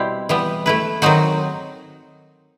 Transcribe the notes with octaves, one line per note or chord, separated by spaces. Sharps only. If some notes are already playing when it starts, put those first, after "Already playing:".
Already playing: B2 G3 C4 E4
E3 G3 B3
A3 E4 B4
D#3 F#3 C4 D#4 F#4